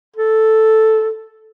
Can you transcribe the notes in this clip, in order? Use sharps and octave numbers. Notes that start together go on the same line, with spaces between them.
A4